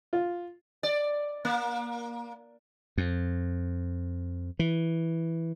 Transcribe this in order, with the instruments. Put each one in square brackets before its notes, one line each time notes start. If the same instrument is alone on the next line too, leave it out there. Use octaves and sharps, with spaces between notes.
[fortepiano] F4
[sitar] D5
A#3
[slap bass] F2
E3